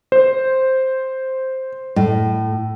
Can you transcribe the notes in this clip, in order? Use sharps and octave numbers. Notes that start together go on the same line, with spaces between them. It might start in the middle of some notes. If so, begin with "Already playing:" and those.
C5
A2